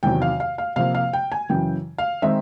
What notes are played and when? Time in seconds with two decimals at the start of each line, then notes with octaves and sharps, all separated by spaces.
0.03 E2 C3 D#3 F#3 G5
0.22 F5
0.40 F5
0.58 F5
0.76 C3 F3 A#3 F5
0.95 F5
1.13 G5
1.32 G#5
1.49 F#2 C#3 E3 G5
1.98 F5
2.22 D#3 G#3 C4 D#4 E5